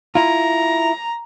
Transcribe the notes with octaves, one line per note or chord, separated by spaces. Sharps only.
E4 F4 A#5